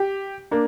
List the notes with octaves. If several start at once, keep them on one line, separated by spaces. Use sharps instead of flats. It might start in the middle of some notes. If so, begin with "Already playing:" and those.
Already playing: G4
A#3 D4